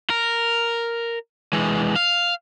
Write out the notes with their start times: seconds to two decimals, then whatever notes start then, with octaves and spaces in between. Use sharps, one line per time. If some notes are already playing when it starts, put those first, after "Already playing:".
0.10 A#4
1.53 E3 G#3
1.96 F5